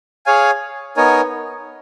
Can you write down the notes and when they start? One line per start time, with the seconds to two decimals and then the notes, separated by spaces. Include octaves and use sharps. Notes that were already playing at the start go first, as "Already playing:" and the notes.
0.26 G#4 C#5 F5 G#5
0.97 B3 D#4 A#4 C#5 G#5